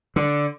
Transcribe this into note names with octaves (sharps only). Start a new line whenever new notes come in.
D3